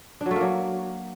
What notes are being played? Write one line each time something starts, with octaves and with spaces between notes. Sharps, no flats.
D4
F#3
A3
A#3
F#3